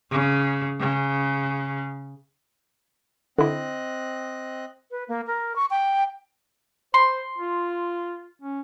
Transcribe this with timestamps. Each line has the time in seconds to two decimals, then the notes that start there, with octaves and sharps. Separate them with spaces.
0.11 C#3
0.80 C#3
3.38 D3 C4 E4 D#5 F#6
4.91 B4
5.08 A#3
5.27 A#4
5.56 C#6
5.70 G5
6.94 C5 C6
7.38 F4
8.42 C#4